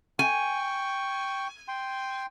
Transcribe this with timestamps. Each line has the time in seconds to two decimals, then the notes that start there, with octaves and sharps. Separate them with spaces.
0.19 G5 G#5 C#6
1.68 G5 C6